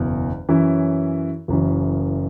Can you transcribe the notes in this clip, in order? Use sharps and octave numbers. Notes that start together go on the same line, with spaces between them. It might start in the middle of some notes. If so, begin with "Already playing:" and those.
Already playing: F#1 E2 B2
F#2 E3 C#4 E4
F#1 F#2 E3